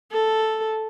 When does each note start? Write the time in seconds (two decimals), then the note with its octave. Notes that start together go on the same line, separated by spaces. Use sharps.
0.12 A4